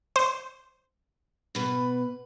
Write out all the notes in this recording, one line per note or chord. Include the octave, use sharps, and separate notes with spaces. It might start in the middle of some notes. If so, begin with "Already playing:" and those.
C5
B2 B4